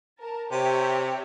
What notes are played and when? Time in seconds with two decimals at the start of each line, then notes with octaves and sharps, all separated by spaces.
0.21 A#4 A5
0.52 C3 G4 C#5 E5